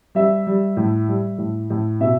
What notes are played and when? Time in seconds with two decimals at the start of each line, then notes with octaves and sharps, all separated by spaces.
0.15 G3 E5
0.47 G3
0.77 A2
1.08 G3
1.38 A2
1.70 A2
2.01 B2 E5